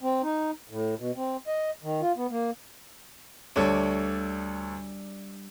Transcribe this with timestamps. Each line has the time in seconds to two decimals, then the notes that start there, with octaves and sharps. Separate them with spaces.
0.01 C4
0.23 D#4
0.69 A2
0.99 B2
1.16 C4
1.47 D#5
1.83 D#3
2.01 F4
2.17 B3
2.30 A#3
3.56 D2 G3 D4 A4 C#5